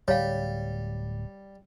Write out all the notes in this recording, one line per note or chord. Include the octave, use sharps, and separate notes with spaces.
D1 G3 C#5 F5